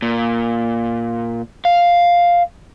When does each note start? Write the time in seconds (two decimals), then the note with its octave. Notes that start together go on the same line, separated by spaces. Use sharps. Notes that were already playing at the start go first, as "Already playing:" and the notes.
0.02 A#2
1.65 F5